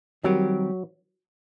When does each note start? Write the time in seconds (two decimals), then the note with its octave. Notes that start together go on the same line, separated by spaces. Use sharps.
0.23 D#3 F#3 G3 C4 G4 A#4